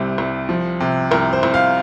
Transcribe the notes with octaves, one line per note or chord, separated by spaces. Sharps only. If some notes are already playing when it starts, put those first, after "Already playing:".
Already playing: C2 C3 G3 C5
C2
F3
C3
C2 A#4
C5
C2
F5